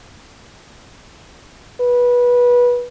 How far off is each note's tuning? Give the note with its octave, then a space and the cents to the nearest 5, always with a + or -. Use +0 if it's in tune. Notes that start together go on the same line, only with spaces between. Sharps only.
B4 -20